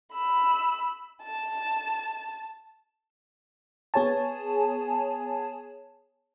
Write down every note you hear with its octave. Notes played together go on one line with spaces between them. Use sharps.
B5 E6
A5
B3 G#4 C#5 G#5 A5